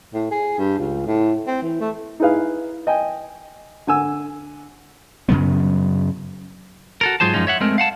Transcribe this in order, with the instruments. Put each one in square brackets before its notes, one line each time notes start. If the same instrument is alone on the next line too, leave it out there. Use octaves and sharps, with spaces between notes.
[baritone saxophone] A2
G#4
G2
C#2
A2
C4
E3
A3
[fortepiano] D#4 E4 G#4 B4 F5
D#5 G5 G#5
D3 G#5 E6
[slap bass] F#2 C#3 F#3 B3
[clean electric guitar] F#4 A4 A#4
G#2 F#3 F4 G#4 C5 A5
F#2 A#2 F3 G#3 C#4 D#4
C#5 E5 F#5
G#3 A3 C4 A#4
F5 F#5 A5